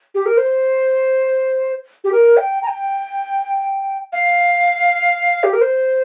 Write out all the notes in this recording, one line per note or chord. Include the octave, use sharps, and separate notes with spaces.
G4
A#4
C5
G4
A#4
G5
A#5
G5
F5
G4
A#4
C5